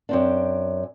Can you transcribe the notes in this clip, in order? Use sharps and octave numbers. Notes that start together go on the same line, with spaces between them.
F#2 C4 D4